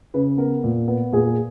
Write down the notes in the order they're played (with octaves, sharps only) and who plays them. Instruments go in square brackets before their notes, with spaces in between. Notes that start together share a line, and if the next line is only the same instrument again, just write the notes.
[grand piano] C#3 B4
B3 A#4
A#2
B3
A#2 G#4